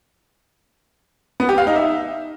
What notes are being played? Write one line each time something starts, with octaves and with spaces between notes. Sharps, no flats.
B3
G4
F5
D#4
E5